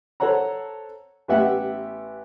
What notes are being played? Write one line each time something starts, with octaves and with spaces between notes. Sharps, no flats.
A4 C5 C#5 F#5 A#5
A1 B3 G4 E5 F#5